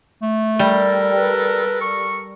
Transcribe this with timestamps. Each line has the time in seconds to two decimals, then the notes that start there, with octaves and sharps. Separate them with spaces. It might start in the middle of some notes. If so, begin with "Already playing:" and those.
0.22 A3
0.59 G3 A4 A#4
1.18 B4
1.81 C#6